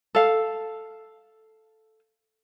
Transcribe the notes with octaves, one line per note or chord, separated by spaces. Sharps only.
A4 F5